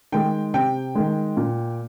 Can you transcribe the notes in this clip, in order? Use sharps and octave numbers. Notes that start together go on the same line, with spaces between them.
D#3 G#3 G5
C3 G5
D#3 G#3
A#2